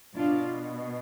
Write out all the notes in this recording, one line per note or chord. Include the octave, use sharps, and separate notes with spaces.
B2 D4 F4